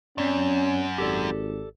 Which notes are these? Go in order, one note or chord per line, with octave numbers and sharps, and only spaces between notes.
F#2 C4 C#4 D5
G#1 G4 A4 D5